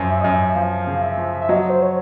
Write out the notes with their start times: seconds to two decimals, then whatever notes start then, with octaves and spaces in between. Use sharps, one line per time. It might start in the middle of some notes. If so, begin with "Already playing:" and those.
Already playing: F#2 F3
0.09 E5
0.21 F#2 D#5
0.31 E5
0.55 F3 F5
0.87 C#3
1.02 E5
1.18 F3
1.41 E5
1.49 F#3 D#5
1.70 C5
1.82 C#5